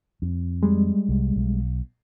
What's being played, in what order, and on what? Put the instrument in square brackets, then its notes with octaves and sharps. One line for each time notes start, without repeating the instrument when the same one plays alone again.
[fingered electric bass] F2
[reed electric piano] G3 G#3
[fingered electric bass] C2
B1